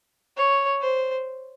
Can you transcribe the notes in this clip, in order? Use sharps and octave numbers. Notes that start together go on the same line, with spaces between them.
C#5
C5